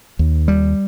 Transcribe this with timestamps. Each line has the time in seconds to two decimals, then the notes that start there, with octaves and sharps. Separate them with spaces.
0.19 D#2
0.48 G3